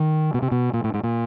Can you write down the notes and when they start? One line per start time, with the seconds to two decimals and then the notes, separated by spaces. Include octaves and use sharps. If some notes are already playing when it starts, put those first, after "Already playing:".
Already playing: D#3
0.34 B2
0.42 C3
0.51 B2
0.73 A#2
0.84 A2
0.94 G#2
1.03 A#2